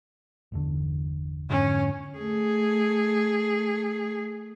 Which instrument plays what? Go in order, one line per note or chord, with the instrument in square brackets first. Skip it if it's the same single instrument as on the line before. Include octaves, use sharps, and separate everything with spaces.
[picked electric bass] G1 E2 D3
[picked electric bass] F2 G#2 D3 [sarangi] C#4
[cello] A3 G#4